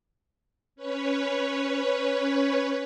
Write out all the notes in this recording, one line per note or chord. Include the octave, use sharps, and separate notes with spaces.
C#4 B4 C#5